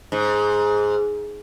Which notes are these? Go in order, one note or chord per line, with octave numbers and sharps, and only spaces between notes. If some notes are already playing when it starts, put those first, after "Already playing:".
G#2